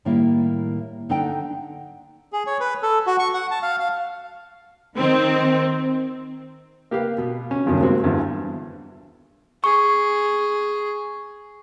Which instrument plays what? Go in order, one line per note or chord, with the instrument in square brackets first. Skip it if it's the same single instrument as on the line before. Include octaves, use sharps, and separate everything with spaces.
[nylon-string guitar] A2 D#3 G3 A#3 E4
D3 D#4 A4 D5 F#5 G5
[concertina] G#4
C#5
B4
A4
F#4
C#6
F#5
A5
F5
F5
[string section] D#3 C4
[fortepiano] A#3 G4 B4 F5
B2
C#4
E2 G2 D#3 F#3 C#4 D4
G3 G#3 A#3 C4 F#4
E2 G2 D3 E3
[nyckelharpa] G#4 [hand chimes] C#6